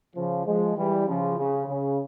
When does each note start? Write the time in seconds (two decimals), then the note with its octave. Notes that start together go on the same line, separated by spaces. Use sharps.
0.16 C#3 F3
0.46 F3 G#3
0.77 E3 G3
1.07 C#3 F3
1.38 C#3
1.67 C#3